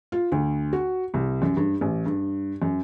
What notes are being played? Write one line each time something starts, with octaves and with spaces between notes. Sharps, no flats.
F4
D2
F#4
C2
F#2
G2
A1
G2
F#2